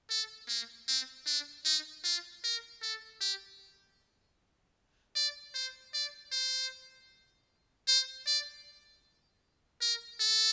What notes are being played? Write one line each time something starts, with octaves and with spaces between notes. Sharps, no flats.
A4
A#3
C4
D4
D#4
F4
A#4
A4
G4
D5
C5
D5
C5
C5
D5
A#4
A4